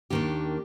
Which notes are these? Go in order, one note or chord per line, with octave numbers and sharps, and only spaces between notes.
D#2 D#3 G3 A#3 D4 G4